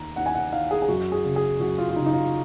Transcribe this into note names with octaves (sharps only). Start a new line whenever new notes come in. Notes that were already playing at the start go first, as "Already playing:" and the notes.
Already playing: D#2 D#3 A#5
D#2 F#5
G#5
F#5
D#3 F5
G#4
G#4
F#2 F#4
G#4
C#3
G#4
F#2 F#4
F4
F4
C#3 D#4
D#4
F4